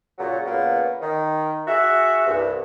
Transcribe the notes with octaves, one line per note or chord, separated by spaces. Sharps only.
A#2 C#3 F#3
A#2 C#3 A#3 B3
D#3
F#4 G#4 E5
C2 G2